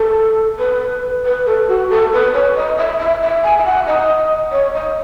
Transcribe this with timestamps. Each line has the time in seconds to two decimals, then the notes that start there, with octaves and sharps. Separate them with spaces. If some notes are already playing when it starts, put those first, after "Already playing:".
Already playing: A4
0.59 B4
1.25 B4
1.46 A4
1.68 F#4
1.90 A4
2.13 B4
2.33 C#5
2.56 D#5
2.78 E5
2.99 E5
3.22 E5
3.43 G#5
3.58 E5
3.65 F#5
3.87 D#5
4.52 C#5
4.74 D#5